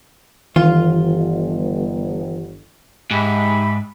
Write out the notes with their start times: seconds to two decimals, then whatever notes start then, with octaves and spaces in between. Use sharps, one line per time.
0.56 G1 D#3 E3 F4
3.11 G#2 G4 E5 B5